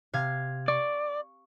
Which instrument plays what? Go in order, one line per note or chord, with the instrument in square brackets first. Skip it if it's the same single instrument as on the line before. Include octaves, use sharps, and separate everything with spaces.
[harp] C3 F5 G#6
[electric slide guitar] D5 [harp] C#6